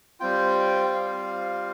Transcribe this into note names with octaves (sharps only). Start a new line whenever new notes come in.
G3 C4 F4 G5
G5
F5